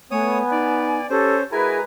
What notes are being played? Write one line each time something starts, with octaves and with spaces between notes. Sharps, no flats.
A3 B3 C#5 G#5 D#6
D#4 D5
C#4 G4 A4 C5
G#3 E4 F#4 G#4 A#4 B4 G#5 A#5